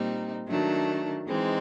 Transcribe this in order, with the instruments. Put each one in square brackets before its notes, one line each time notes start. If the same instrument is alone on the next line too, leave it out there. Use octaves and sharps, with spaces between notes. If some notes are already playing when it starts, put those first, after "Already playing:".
Already playing: [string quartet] A#2 G3 C4 D#4
D#3 F#3 A3 D4
E3 G#3 C4 D#4